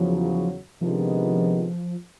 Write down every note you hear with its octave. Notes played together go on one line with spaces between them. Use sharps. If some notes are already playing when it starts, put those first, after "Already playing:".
Already playing: E2 C#3 F3 F#3
C3 D#3 F3 G#3 B3 D4